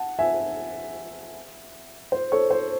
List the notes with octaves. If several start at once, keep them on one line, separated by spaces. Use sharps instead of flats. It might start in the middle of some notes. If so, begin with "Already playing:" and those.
Already playing: F#5 A5
E5 G#5
C5
A4 C#5
C5